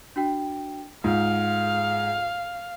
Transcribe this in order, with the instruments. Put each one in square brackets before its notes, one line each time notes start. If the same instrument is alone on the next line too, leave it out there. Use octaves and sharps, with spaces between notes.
[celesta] D4 F#4 G5
[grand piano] G#2 [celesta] F4 [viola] F5